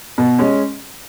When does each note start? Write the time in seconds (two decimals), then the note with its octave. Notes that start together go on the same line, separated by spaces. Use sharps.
0.18 B2
0.39 G#3 C#4